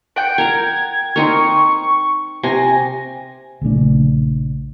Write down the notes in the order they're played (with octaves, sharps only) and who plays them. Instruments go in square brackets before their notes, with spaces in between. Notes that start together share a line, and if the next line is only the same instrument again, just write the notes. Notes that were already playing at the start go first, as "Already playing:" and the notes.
[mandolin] F#5 G5 [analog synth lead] D7
[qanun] A#4 A#5 [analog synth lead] G#6
[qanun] C4 D#4 A#4 [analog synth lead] C#6
[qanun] C3 [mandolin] G#5 [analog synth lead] A#6
[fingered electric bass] A#1 C#3 A3 D4